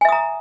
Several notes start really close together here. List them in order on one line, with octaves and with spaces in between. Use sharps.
G#5 E5 D#6 A#5